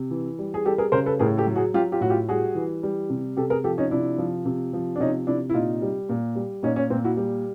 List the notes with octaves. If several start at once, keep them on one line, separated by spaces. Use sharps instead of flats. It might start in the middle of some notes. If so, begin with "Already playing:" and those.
Already playing: C3
E3
G3
G#4
G3 G4 A4
G#4 A#4
C#3 A#4 C5
A4 B4
A2 G#4 A#4
G4 A4
F#3
F#4 G#4
F#3 F4 G4
F4 G4
A2 F#4
F4 G4
G3 F#4 G#4
E3
G3
C3
C3 G4 A4
G#4 A#4
F3 G4 A4
C#4 D#4
C3 D4 E4
F3
C3
F3
D4
C3 C#4 D#4
C3 D4 E4
E4
A#2 D#4 F4
G3
A#2
G3
A#2 C#4 D#4
C#4
A#2 C4
E4 F#4
G3